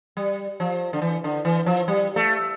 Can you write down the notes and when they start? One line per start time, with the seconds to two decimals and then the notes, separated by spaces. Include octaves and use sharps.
0.17 G3
0.60 F3
0.93 D3
1.02 E3
1.24 D3
1.45 E3
1.66 F3
1.88 G3
2.16 A3